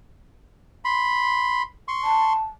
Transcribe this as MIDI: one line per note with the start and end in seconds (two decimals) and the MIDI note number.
0.85 1.63 83
0.85 1.63 84
1.88 2.33 84
1.88 2.33 85
2.04 2.44 81